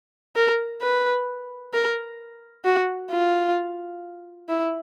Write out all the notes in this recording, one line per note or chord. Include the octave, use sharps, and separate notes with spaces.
A#4
B4
A#4
F#4
F4
E4